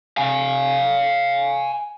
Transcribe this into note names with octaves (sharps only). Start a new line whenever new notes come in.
F5 G#5